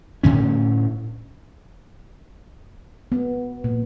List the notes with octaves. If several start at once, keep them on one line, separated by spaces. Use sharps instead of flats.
A2 D3 C#4
B3
A#2